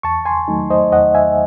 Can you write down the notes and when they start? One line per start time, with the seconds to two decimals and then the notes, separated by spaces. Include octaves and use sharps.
0.03 E2 A5 C#6
0.25 G#5 C6
0.48 D#3 F#3 A3 D#4
0.70 C5 D#5
0.92 E2 D#5 F#5
1.15 E5 G#5